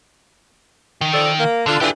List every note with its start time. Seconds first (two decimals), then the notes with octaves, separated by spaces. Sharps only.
1.01 D#3
1.13 F3 A4 D5
1.39 A#3
1.66 D3 D4 F4 A4
1.81 D3 E3 F4 G4 G#4